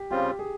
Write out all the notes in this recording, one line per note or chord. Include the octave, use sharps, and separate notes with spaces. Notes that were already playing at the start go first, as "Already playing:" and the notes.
Already playing: G4
C#3 G3 C4 F4 G4
G#4